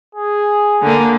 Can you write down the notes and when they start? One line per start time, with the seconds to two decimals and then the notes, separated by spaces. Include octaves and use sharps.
0.15 G#4
0.82 D3 A#3